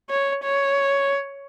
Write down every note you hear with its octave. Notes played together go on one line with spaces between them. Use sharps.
C#5
C#5